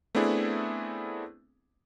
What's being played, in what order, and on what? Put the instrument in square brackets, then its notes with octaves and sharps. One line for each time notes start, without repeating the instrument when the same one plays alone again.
[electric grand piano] A3 B3 C4 D4 E4 G#4